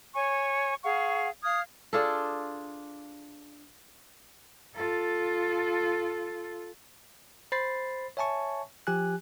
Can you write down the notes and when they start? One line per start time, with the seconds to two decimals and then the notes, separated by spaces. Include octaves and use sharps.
0.14 C#5 G#5 C#6
0.83 G#4 F5 F#5 C#6
1.44 F5 D#6 F6 G#6
1.93 D4 F4 G#4 A4
4.75 F4 A4
7.52 C5 B5 A6 C7
8.17 C#5 E5 G#5 A5 C#6
8.87 F3 G4 G#5 F#6